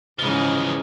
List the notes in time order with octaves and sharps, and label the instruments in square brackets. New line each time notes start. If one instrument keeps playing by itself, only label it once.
[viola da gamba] G#2 C#3 D#5 [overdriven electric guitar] E3 F3